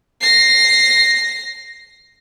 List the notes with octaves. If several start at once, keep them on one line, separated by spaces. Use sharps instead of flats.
A#6 C7